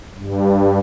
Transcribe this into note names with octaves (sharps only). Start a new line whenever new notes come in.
G2